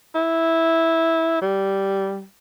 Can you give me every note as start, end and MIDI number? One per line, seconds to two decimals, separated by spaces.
0.15 1.38 64
1.42 2.25 55